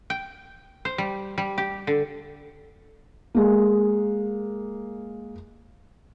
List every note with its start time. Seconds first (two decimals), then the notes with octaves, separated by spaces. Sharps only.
0.10 G5
0.85 C5
0.98 G3
1.38 G3
1.58 G4
1.87 D3
3.35 G#3 A#3